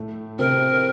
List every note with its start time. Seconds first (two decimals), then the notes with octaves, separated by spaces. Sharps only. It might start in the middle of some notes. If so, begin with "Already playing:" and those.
Already playing: A2 A3
0.39 C3 C4 A#4